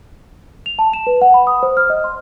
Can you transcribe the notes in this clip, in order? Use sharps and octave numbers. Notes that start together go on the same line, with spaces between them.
F7
A5
E7
B4
F#5
B5
D#6
C5
F6
D#5
C6